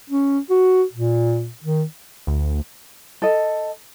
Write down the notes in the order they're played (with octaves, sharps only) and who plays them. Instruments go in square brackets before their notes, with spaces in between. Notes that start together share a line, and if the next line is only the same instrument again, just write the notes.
[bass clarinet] C#4
F#4
A#2
D#3
[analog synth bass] D2
[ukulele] A4 D#5